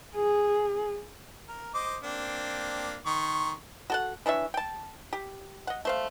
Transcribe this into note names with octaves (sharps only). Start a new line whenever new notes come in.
G#4
A#4
C5 D#5 D6
A#3 C4 D4
D#3 C6 C#6
F#4 A4 F#5
E3 D4 C#5 E5
G5 A5
G4
D#5 F#5
A3 C5 F5